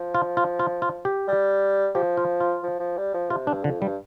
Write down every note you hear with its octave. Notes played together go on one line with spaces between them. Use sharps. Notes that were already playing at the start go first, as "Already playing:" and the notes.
Already playing: F3
F4
F4
F4
F4
G4
G3
F3 G4
F4
F4
F3
F3
G3
F3
C3 F4
G2 D4
F2 D3
G2 G3